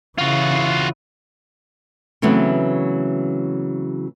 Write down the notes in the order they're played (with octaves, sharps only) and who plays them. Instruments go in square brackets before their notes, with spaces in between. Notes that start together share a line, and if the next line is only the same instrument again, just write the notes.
[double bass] C#3 E3 [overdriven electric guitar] F4 F#4
[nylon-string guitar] C#3 E3 F#3 A3 B3 C4